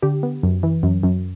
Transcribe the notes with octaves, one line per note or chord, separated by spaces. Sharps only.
D3 G4
B3
F#2
E3
F#2
F#2